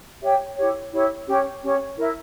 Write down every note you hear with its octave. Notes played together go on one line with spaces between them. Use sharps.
G4 C#5 E5 G5
E4 G4 C#5
E4 G4 C#5
C#4 G4 C#5
C#4 G4 C#5
E4 A#4 E5